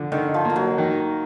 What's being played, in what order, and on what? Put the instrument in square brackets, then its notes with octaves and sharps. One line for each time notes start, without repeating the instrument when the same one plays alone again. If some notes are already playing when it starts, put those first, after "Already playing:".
Already playing: [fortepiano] D3 F3
[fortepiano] D3 [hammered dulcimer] D#3
[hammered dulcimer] F3
[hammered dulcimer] F3 [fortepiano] A#3
[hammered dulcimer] F#3
[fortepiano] D#3